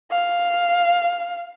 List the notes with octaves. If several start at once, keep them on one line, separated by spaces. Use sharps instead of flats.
F5